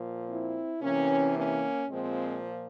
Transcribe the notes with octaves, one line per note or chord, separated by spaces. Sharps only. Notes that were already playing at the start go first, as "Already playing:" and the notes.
Already playing: A#2 F3
C4 E4
C3 E3 A#3 C#4
A#3 C#4
A#2 F3 G#3 C4